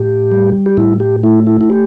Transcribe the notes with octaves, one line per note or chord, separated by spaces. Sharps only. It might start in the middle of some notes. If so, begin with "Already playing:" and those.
Already playing: A2 G4
G3
G4
A2 E4
G4
A3 E4
E4
E4
G4